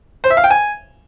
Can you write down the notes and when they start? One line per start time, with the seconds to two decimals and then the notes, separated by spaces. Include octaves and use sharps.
0.24 C5
0.30 E5
0.37 F5
0.44 G5
0.51 G#5